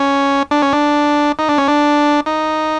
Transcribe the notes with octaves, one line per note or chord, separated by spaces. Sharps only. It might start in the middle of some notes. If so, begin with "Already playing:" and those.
Already playing: C#4
D4
C#4
D4
D#4
D4
C#4
D4
D#4